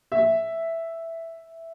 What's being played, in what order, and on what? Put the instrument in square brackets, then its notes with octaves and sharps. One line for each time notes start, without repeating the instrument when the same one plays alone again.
[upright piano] E5